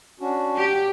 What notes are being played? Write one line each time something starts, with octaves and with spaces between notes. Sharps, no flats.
C#4 D4 F#4
G4